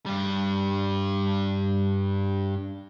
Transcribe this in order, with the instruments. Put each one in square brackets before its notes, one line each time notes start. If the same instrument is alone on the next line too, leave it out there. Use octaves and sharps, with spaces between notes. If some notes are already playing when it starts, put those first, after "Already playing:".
[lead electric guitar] G2 G3